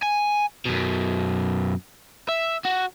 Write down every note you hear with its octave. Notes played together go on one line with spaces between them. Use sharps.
G#5
F#2 B2
E5
F#4